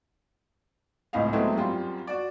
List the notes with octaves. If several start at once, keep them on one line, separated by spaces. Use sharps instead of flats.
C#2 A2 C4 D#5 F5
F#3 G#3 A3 B3 C4 E4
F#2 G3 C4 F4
F#4 D5